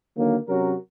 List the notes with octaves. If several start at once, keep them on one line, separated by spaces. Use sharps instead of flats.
D3 D#3 F#3 A#3
C3 F#3 C#4 F#4 A#4